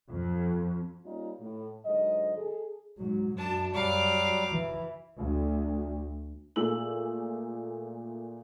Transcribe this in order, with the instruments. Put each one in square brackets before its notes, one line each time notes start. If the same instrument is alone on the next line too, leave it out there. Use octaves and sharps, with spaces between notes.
[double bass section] F2
[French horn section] G3 A#3 C#4 D#4 F4
A2
G#2 D3 F#3 D#5
G#4 A4
[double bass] G#2 F#3
[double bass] F#2 [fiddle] D4 A5
[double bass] F#2 [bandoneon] F#3 G3 [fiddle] F5 D6
[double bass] E3
[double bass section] D2
[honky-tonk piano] A#2 A3 G#4 E6 F#7